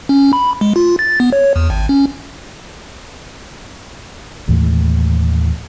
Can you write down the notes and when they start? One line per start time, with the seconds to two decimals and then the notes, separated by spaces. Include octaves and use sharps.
0.09 C#4
0.33 B5
0.61 G#3
0.76 F4
0.99 A6
1.20 B3
1.33 C#5
1.56 E2
1.70 G#1
1.89 C#4
4.48 D#2 A2 E3 G#3